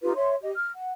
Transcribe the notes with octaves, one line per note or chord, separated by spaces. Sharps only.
D#4 F4 G4 B4
C#5 E5 C6
G4 D#5
F6
F#5